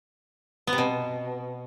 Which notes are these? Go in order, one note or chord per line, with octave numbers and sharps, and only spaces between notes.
B3
C3
B2